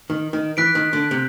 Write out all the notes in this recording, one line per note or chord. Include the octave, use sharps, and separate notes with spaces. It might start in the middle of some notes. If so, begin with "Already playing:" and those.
D#3
D#3
E3 F#6 B6 D7
D#3
D3
C3